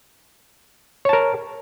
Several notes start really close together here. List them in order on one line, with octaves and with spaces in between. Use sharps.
C#5 A5 A#4